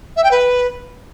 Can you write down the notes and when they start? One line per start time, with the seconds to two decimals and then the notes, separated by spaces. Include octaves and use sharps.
0.16 E5
0.24 G5
0.31 B4